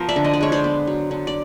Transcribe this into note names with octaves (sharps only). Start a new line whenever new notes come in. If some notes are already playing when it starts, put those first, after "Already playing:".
Already playing: F3 B3 A#4 C5
D5 E5
D3
D#5
D5
G#3 C#5
C5 D5
B3
F#3
D3
D5